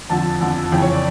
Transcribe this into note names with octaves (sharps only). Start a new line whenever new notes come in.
F2 D3 F3 A5
F2 D3 F3
F2 C#3 E3 G5
C#5
D5